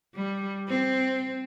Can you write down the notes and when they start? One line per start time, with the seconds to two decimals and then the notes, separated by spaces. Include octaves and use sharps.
0.15 G3
0.68 C4